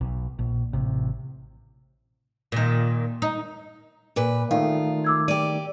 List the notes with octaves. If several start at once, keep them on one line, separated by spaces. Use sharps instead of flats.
B1
A#1
A1 C3
A#2 D#3
D#4
A#2 B4
D#3 A3 F4 D5 F5
D6 E6 G#6
G4 D5 D#7